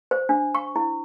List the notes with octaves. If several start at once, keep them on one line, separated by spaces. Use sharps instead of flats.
C5
D4
C#6
E4